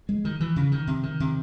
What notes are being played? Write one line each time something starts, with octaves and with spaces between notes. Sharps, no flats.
G#3
D#3
E3
C#3
D#3
C3
D#3
C3